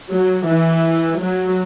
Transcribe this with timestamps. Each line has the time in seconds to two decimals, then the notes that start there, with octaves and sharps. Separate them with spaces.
0.09 F#3
0.47 E3
1.20 F#3